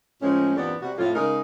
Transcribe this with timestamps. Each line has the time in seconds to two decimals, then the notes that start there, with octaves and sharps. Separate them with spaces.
0.22 A2 F3 G#3 C#4
0.56 E2 G2 A#2 B3 C4 D5
0.82 C3 G3 F#4
0.97 F2 A2 F4
1.15 C#3 G#3 D#4 G#4 A#4